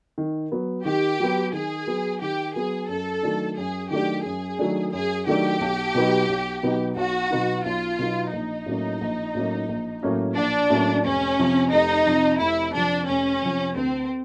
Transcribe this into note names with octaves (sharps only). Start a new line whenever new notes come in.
D#3
F#3 B3
D#3 G4
F#3 B3
D#3 G#4
F#3 B3
D#3 G4
F#3 B3 G#4
F#2 A4
D#3 F#3 A3 D4
F#2 G#4
D#3 F#3 A3 D4 G4
F#2 G#4
D#3 F#3 A3 D4
F#2 G#4
D#3 F#3 A3 D4 G4
B1
B2 F#3 B3 D#4
B1
B2 F#3 B3 D#4
B1 F#4
B2 F#3 B3 D#4
B1 F4
B2 F#3 B3 D#4
A#1 D#4
A2 F#3 A#3 C#4
A#1
A2 F#3 A#3 C#4
A#1
A2 F#3 A#3 C#4
A#1 D4
A2 F#3 A#3 C#4
F1 C#4
F2 C3 F3
F1 D#4
F2 C3 F3
F1 E4
F2 C3 F3 D4
F1 C#4
F2 C3 F3
D2 C4